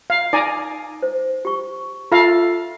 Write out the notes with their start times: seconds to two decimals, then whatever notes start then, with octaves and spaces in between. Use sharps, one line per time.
0.10 F5
0.33 D#4 D5 G#5 A#5
1.03 C5
1.45 G4 C#6
2.12 F4 A4 E5 F5